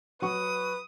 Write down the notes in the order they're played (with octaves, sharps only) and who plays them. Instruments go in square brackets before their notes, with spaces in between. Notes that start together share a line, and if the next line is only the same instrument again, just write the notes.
[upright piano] F#3 F#5 C#6 [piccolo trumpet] B4 [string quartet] D#6